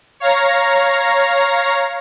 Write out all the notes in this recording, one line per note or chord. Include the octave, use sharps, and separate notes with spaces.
C#5 F5 A#5 A#6